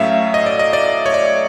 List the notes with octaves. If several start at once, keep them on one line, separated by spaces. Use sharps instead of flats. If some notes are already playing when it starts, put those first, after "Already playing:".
Already playing: A2 F#3 A3 C#4 E5 F5
D#5
D5
D#5
D5
C#5
D5